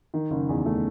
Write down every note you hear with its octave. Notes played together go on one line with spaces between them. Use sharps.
D#3
F#1
E2
A3